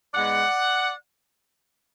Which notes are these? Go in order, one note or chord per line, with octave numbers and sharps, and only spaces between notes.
G#2 G#3 B3 D5 F#5